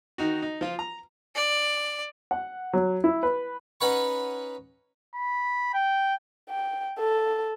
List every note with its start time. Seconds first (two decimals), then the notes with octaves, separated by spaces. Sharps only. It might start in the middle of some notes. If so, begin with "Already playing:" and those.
0.18 D#3 D#4 F#4
0.42 D#4
0.61 F3 F4
0.79 A#5
1.36 D5
2.31 F#5
2.73 F#3
3.04 E4
3.23 B4
3.81 C#4 D#4 B4 F#5 B5 C#6
5.15 B5
5.74 G5
6.50 G5
6.99 A4